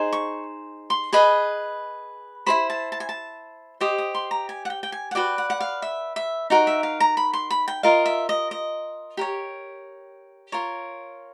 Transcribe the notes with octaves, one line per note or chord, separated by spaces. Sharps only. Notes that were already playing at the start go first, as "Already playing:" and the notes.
Already playing: D#4 G#4 C5
C#6
C6
G#4 B4 D#5 B5
E4 G#4 C5 B5
A5
A5
G#5
A5
G4 C5 D#5 D#6
D#6
C6
A#5
G#5
F#5
G5
G5
G#5
F#5
F#4 B4 D5 G5
F#5
F#5
F5
E5
E5
D#4 F#4 A#4
E5
F5
A#5
B5
C6
B5
G5
F4 A#4 D#5 F5
E5
D#5
D#5
G4 A#4 C#5
F4 A#4 C#5